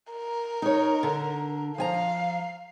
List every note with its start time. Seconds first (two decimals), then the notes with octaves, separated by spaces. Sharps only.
0.12 A#4
0.62 D#4 C#5
1.03 D3
1.78 F3 F5 G#5 A#5